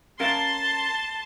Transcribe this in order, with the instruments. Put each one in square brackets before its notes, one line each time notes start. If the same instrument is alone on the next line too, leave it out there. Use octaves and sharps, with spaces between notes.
[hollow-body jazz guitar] C#4 A#4 F5 [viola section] A5 C6